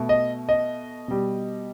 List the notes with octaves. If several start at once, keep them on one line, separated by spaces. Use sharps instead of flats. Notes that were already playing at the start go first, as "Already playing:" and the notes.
Already playing: B2 A3
D#5
D#5
B2 G3